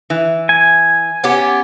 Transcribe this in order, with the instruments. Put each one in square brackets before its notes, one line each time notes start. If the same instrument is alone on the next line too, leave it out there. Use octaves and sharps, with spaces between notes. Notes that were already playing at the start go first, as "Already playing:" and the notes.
[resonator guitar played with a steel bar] E3
[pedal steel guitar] G#5
[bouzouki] B3 C#4 G4